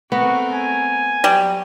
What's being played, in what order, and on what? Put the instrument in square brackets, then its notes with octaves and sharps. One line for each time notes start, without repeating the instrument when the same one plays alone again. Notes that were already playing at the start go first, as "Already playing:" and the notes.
[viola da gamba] A3 C4 A#4 [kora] B3 [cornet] F#4
[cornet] G#5
[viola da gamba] F#3 [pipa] G3